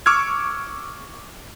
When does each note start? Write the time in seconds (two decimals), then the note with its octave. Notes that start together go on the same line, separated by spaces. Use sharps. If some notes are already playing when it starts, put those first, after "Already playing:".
0.06 C#6 D6 E6 F6 G#6